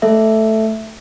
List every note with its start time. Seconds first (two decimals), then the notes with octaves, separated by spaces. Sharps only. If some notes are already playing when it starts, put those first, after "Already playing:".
0.02 A3 A4 E5